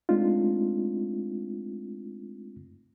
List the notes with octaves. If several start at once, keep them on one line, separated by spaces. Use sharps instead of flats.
G#3 A3 C4 D4 D#4 F4